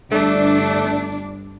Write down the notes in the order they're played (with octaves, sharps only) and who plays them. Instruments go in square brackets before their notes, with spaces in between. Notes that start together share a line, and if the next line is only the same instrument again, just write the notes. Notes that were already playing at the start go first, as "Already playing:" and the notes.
[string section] G1 D4 [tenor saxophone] A3